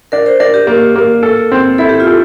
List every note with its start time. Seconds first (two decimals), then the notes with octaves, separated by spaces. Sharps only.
0.12 D4 A#4
0.26 C5
0.40 D4 A#4
0.54 G4
0.67 A#3
0.96 A#3
1.23 A4
1.52 C4
1.78 E4 A4
1.89 G4
2.00 F4
2.07 A4